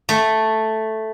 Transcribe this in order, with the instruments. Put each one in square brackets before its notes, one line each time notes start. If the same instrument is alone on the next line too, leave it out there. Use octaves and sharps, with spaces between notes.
[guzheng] A3